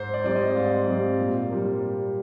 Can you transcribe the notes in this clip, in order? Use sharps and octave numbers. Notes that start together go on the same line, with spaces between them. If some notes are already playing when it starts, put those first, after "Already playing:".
Already playing: G#2 C5
D5
G3 C4 D5
D#5
G#2 F5
G3 C4
A#2
G3 A#3